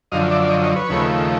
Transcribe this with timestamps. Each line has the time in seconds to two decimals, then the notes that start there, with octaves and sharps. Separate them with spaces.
0.12 F#2 D3 F3 D#5 F5
0.31 D5 E5
0.42 D5
0.50 C#5 D#5
0.63 C#5 D#5
0.76 B4 C#5
0.89 D#2 C#3 F3 A3